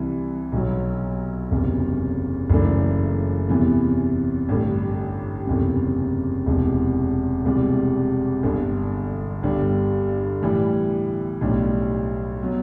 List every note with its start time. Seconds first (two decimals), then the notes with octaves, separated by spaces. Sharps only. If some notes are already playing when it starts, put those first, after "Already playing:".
Already playing: C2 C3 E3
0.52 B1 B2 F#3
1.51 F#1 E2 C3
2.50 F#1 F#2 E3 A3 D4
3.49 E2 C3 E3 B3
4.49 A1 G2 D3 A3
5.47 F#1 E2 C3
6.46 E1 E2 C3
7.45 E1 E2 C3 G3
8.43 G1 G2 D3
9.43 G1 G2 D3 G3
10.41 A2 E3 G3
11.41 B1 A2 G3 D4
12.43 F#3 B3